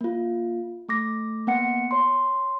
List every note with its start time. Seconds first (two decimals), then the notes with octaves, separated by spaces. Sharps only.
0.01 A#3 F4
0.89 A3 D6 A#6
1.47 A#3 B3 F#5 C#7
1.91 C#5 C6